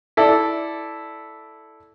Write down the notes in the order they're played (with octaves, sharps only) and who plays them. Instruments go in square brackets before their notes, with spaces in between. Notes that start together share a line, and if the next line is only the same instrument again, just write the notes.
[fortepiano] E4 A4 D5